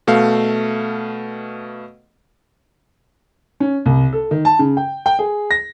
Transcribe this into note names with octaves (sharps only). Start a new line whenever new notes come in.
B2 A3 F5
C#4
C2
A4
D#3
A5
C#3
G5
G5
G#4
A#6